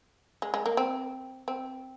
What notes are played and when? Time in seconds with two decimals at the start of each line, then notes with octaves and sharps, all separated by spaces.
0.42 G#3
0.54 G#3
0.66 A#3
0.77 C4
1.48 C4